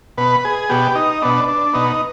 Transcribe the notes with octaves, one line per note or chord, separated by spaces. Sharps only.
B2 B3 B4
G#4
B2 B3 G4
D#4
B2 B3 D4
D4
B2 B3 D#4